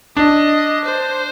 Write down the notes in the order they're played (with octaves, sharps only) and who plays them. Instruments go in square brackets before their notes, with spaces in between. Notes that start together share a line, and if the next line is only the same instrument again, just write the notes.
[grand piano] D4 [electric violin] D#5
[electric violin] C5